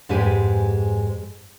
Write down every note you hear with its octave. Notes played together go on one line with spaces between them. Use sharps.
F2 G#2 G#3 G4 B4 G#5